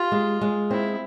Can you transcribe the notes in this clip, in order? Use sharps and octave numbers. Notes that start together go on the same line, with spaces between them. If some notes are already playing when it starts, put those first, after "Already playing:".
Already playing: F4 G4
G#3
G#3
C4 E4